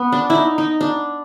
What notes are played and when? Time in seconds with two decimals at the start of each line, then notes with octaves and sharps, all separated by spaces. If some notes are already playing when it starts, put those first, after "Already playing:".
Already playing: B3
0.12 D4
0.30 E4
0.35 D#4
0.58 D#4
0.81 D4